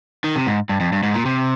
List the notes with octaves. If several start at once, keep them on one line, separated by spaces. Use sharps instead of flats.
D#3
C3
G#2
G2
F2
G2
G#2
A#2
C3